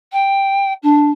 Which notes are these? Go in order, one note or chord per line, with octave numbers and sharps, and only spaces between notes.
G5
D4